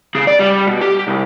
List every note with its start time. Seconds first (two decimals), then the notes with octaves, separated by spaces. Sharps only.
0.15 C#3 G#4
0.27 D5
0.39 G3
0.67 B2
0.81 G4
1.07 C2